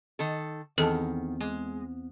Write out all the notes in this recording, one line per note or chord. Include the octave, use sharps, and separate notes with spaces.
D#3 A4
E2 D#3 C4 A4 A5
G#3